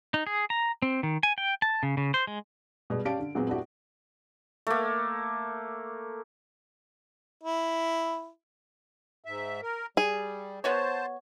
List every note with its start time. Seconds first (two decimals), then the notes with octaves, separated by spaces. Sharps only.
0.14 D#4
0.27 G#4
0.50 A#5
0.82 C4
1.03 D#3
1.23 G#5
1.38 G5
1.62 A5
1.83 C#3
1.97 C#3
2.14 C5
2.27 G#3
2.90 B2 G3 G#3
3.05 C#4 G4 D5 F5 A5 D7
3.19 D3
3.35 A#2 F#3 G#3 B3 C4
3.48 B3 D4 E4 F#4 G4
4.67 A3 A#3
7.43 E4
9.24 G#2 E5
9.63 A#4
9.97 G3 G#4
10.64 B3 F#4 C5 C#5 A5